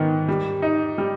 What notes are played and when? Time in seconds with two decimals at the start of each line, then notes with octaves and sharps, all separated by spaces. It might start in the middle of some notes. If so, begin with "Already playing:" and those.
Already playing: G#2 D#3 B3
0.28 G3
0.62 D#4
0.98 G3